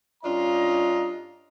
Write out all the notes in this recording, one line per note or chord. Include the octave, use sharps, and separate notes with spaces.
G2 C#4 D4 F4 D#5 A#5